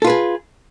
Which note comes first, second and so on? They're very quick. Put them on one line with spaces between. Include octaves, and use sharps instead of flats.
A4 F4 B4 G#4